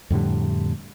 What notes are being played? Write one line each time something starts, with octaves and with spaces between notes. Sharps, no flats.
F2 A2 D3 G3